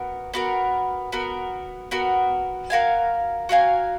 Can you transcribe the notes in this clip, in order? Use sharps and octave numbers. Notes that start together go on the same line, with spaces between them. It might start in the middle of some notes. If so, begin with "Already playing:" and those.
Already playing: B3 F#4 A#4
B3 F#4 A#4
B3 F#4 A#4
B3 F#4 A#4
F#4 A#4 F5 G#5
F#4 A#4 F5 G#5